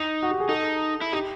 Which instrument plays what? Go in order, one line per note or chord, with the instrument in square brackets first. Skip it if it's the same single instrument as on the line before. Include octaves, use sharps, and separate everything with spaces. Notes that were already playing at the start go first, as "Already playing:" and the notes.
Already playing: [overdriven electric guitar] D#4
[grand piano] F#4
G4
G#4
[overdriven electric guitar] D#4 [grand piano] A4
[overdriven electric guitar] E4
[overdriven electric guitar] D#4 [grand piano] G4